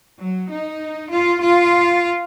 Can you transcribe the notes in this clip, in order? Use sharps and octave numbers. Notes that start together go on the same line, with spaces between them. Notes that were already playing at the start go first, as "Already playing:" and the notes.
F#3
D#4
F4
F4